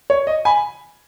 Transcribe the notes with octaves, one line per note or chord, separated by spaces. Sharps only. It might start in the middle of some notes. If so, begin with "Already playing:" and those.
C#5
D#5
G#5 B5